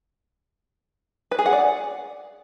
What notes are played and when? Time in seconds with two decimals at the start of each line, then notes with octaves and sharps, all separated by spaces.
1.31 B4
1.39 G#4
1.46 F#5
1.53 D5